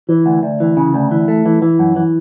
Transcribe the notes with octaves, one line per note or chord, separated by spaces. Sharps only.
E3
D2
D2
E3
C#3
D2
E3
A3
E3
E3
F#2
E3